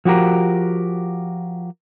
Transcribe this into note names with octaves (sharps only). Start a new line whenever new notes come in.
F3 F#4 G4 A#4